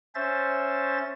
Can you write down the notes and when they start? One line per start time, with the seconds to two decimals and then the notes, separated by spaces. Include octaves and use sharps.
0.15 C#4 C5 E5 A6